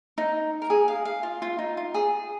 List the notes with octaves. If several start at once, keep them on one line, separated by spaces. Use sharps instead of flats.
D#4
A#4
G#4
F5
F5
F4
F4
D#4
F4
G#4